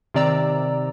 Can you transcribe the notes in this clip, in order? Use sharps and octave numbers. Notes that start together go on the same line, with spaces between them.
C3 D#3 C4 D5 A#5 E6